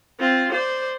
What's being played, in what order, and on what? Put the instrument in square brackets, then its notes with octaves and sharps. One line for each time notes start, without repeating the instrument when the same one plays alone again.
[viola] C4 F4
C5 D5